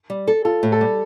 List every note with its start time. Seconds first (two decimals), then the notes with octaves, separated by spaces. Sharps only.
0.10 G3
0.27 A4
0.45 F4 A4
0.63 A2
0.72 A4
0.81 G3